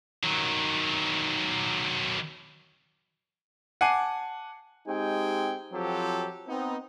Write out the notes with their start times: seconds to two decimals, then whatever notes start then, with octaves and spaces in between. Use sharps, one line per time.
0.23 D#3 F#3
3.81 F#5 G#5 A5 D6 C7 D#7
4.87 G#3 C4 D#4 G4 G5 G#5
5.72 F3 F#3 C4 F4 G4 A4
6.47 B3 C4 D#4